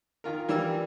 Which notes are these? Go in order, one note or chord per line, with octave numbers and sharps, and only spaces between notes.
D#3 F4 A#4
E3 G3 A#4 E6